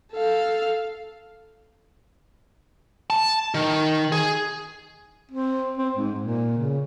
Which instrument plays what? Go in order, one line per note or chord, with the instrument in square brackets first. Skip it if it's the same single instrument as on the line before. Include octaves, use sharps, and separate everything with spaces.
[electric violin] A4 F5
[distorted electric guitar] A5
D#3
G#4
[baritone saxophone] C4
C4
G#2
A#2
C#3